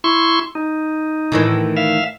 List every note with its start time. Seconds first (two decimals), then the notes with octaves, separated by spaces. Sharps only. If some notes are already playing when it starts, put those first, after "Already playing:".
0.04 E4 C6 C#6
0.55 D#4
1.32 A2 D#3 E3
1.77 E5 F5